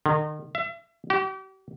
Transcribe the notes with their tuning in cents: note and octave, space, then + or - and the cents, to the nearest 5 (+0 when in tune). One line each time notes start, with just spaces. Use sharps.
D#3 -35
E5 +35
G4 -40